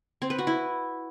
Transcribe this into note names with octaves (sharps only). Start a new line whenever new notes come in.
C4
B4
F#4
E4